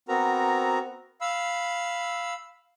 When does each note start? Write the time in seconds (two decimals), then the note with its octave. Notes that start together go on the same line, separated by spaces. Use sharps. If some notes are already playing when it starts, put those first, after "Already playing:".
0.08 B3 C4 F#4 A#4 A#5
1.21 F5 B5 E6